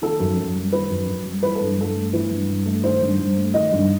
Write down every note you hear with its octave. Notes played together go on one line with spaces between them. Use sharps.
D#3 A4
F#2
F#2
G3
D#3 B4
F#2
F#2
G3
E3 B4
A4
G2
G2 A4
A3
E3 B4
G2
G2
A3
D#3 C5
G2
G2
A3
D#3 D#5
G2